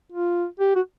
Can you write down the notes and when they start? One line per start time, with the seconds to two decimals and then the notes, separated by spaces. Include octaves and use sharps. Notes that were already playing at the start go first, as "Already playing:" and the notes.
0.12 F4
0.60 G4
0.76 F#4